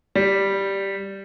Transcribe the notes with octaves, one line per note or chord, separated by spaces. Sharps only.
G3